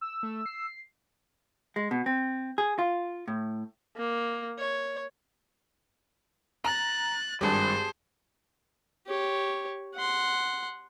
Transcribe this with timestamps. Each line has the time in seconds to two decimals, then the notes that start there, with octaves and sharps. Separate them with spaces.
0.01 E6
0.23 A3
0.46 C7
1.76 G#3
1.91 B2
2.06 C4
2.58 G#4
2.79 F4
3.28 A2
3.97 A#3
4.59 C#5
6.64 A#5 F#6 A6
7.41 G#1 G2 G4 G#4 C5 A5
9.07 G4 C#5
9.95 F#5 C6